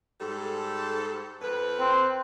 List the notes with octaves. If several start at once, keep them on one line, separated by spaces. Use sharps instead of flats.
G#2 G3 A4
F2 B4
C4